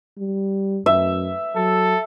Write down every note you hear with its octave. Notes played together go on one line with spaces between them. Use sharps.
G3
F#2 E5
F#3 A4